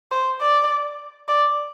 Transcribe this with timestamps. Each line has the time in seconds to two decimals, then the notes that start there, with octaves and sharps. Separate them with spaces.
0.12 C5
0.42 D5
1.28 D5